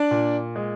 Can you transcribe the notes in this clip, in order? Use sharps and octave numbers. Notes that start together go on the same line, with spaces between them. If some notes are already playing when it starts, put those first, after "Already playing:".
Already playing: D4 D5
A#2
G#3